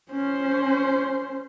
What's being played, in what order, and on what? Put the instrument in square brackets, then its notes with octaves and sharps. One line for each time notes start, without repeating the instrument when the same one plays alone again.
[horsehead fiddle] C#4 C5